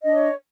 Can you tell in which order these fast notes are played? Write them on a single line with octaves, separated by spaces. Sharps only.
D#5 D4 C#5